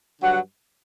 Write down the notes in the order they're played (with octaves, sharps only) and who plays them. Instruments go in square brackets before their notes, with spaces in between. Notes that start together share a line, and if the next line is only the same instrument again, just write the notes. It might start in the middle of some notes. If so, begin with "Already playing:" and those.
[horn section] G2 D3 F#3 F#5